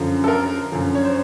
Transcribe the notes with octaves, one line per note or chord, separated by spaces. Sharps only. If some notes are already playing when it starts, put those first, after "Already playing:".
Already playing: F#2 D3 F3
A4
A#4
F#2 D3 F3
C#5
C5